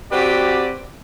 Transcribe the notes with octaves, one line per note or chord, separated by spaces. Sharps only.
C4 F#4 G4 B4 D5